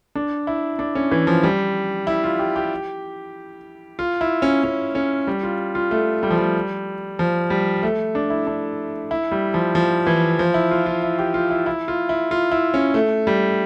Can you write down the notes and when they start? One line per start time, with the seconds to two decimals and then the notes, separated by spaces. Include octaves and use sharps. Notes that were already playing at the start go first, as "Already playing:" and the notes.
0.15 D4
0.47 E4
0.79 D4
0.95 C#4
1.11 E3
1.27 F3
1.43 G3
2.07 E4
2.24 F4
2.39 G4
2.56 G4
3.99 F4
4.21 E4
4.42 C#4
4.64 C#4
4.95 C#4
5.27 G3
5.43 F4
5.75 F4
5.91 A3
6.23 G3
6.31 F3
6.38 G3
7.19 F3
7.50 G3
7.83 A3
8.15 D4
8.30 E4
8.47 D4
9.11 E4
9.31 G3
9.54 F3
9.75 F3
10.07 E3
10.39 F3
10.54 E4
10.71 F4
10.86 F4
11.03 E4
11.18 G4
11.34 F4
11.51 E4
11.66 E4
11.88 F4
12.09 E4
12.31 F4
12.52 E4
12.74 C#4
12.94 A3
13.27 G3